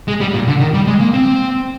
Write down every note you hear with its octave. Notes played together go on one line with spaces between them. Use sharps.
G#3
G3
A#2
D3
D#3
G3
G#3
A#3
C4